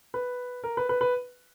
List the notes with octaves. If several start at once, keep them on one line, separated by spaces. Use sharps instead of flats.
B4
A#4
B4
B4
B4